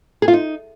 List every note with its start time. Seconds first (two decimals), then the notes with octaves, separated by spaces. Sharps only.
0.22 G#4
0.28 F4
0.34 D#4